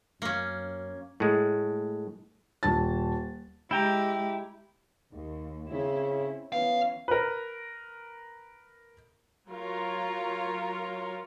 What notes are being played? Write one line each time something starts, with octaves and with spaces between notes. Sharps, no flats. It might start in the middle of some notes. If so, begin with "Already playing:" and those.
F#2 A#3 C#4
A2 G#3
D#1 A5 A6
G#3 E4 G4 G5 A#5
D#2
C#3 C4 C#4 E4
E3 B3 C#4 F5
A#4 B4
F#3 F4 A#4 C#5